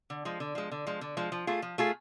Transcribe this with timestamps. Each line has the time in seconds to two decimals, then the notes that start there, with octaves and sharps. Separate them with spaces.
0.10 D3
0.25 F3 G#3
0.40 D3
0.55 F3 G#3
0.72 D3
0.87 F3 G#3
1.01 D3
1.17 F3 G#3
1.32 F3
1.47 A3 F4 G#4
1.62 F3
1.78 A3 F4 G#4